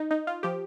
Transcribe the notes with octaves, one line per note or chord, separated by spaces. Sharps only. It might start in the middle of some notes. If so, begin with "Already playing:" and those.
Already playing: D#4
D#4
F4
F3 G4